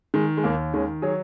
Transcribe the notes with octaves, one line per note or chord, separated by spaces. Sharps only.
D#3 G#3
G#3
D#2 A#3
D#3 G#3 C#4
F#3 G#4 C#5